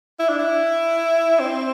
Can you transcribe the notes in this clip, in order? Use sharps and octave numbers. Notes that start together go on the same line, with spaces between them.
E4
D4
E4
C4